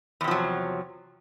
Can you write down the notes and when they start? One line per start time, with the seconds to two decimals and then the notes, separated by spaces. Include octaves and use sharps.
0.21 E2
0.24 C3
0.28 F3
0.31 F#3